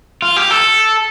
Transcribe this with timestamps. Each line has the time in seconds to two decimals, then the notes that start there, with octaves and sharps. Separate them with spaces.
0.22 F4
0.36 G4
0.51 A4